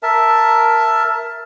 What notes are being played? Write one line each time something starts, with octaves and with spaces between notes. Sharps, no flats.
A#4 E5 A5